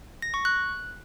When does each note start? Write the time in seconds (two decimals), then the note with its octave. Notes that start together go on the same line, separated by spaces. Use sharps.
0.22 A#6
0.34 C#6
0.45 F#6